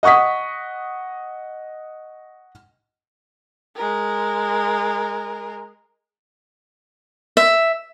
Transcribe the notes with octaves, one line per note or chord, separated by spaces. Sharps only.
D#5 F#5 C#6 D#6 B6
G#3 A#4
E5